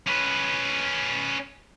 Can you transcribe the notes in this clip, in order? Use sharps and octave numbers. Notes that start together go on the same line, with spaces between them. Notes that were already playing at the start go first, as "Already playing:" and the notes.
C#4 B4